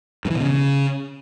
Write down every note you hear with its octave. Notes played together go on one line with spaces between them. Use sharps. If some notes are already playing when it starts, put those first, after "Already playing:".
G2
E3
B2
C#3